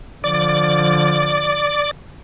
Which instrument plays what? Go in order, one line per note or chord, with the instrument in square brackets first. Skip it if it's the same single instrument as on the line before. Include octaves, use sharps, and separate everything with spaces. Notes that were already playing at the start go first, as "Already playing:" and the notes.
[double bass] D3 F3 [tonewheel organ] D5 D6